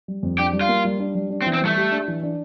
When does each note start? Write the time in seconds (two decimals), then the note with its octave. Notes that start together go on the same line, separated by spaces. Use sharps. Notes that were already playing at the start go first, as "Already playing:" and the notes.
0.08 G3
0.23 F2
0.39 D4 G4
0.53 G3
0.61 F4
0.68 A#3
0.85 G3
1.00 D4
1.15 G3
1.30 D4
1.42 C4
1.46 E3
1.54 C4
1.62 G3 A3
1.77 G4
1.92 D4
2.08 E3
2.23 D4